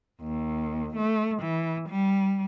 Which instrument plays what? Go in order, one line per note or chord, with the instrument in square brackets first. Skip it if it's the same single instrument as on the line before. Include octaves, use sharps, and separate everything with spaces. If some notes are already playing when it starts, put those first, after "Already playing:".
[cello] D#2
A3
E3
G3